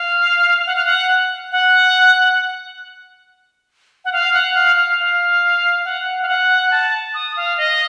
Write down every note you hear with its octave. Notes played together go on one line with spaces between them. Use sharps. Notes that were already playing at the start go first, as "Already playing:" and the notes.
Already playing: F5
F#5
F5
F#5
F#5
F#5
F5
F#5
F5
F5
F5
F#5
F5
F#5
A5
D#6
F5
D#5